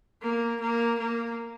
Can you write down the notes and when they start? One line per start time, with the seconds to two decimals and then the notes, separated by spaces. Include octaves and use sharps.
0.22 A#3
0.60 A#3
0.99 A#3